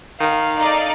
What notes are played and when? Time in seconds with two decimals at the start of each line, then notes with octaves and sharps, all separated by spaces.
0.20 D#3 F5
0.59 D#4 A4 D5